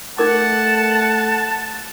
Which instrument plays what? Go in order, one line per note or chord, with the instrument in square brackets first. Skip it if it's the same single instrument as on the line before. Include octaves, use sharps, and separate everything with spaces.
[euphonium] A3 [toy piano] D#4 A#4 D6 [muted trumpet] F#5 [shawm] A5